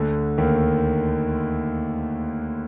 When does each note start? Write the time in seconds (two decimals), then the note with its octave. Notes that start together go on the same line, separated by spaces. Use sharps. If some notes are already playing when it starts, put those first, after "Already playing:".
Already playing: D2 D3
0.38 D#2 D#3